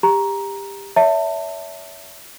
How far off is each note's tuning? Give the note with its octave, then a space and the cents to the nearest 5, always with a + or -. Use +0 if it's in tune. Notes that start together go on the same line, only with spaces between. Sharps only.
G4 +25 A#5 +10
C#5 +35 E5 -10 A5 +30